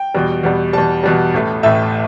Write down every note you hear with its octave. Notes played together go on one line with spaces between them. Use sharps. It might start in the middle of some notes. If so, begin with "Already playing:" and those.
Already playing: G5
E2 B2 G3
E2 B2 G3
E2 B2 G3 A5
E2 B2 G3
A1 A2 A3
A1 A2 A3 E5